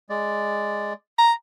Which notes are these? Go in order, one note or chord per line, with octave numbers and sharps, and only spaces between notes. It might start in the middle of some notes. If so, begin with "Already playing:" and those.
G#3 D5
A#5